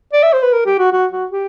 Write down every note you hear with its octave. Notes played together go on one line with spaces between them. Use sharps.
D5
E5
C5
B4
A#4
G4
F#4
F#4
F#4
G4